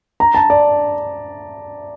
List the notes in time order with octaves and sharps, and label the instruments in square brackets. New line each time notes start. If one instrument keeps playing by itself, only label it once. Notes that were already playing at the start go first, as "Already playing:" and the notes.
[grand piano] A#5
A5
D5